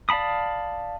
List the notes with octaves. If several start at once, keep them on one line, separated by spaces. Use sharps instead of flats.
D5 F5 A5 B5 D#6